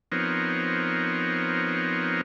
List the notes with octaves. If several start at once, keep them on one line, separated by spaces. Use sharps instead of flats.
F3 B3 C4 D#4 A#4 C#5